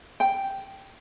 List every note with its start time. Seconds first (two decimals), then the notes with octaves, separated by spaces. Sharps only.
0.20 G5